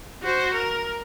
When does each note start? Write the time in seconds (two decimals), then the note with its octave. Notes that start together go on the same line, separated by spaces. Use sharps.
0.23 F#4 C5
0.54 A#4